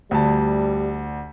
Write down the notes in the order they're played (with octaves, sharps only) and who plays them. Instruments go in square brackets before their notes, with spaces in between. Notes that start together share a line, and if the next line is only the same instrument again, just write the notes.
[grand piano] D2 A5 [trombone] G3